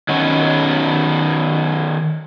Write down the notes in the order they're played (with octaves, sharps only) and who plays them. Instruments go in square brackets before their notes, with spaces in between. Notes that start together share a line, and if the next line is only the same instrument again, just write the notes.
[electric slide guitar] D#3 F#3 B3 C#4